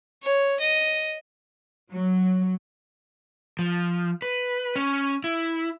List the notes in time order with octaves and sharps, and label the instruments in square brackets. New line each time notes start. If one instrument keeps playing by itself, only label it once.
[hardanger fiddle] C#5
D#5
[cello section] F#3
[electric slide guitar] F3
B4
C#4
E4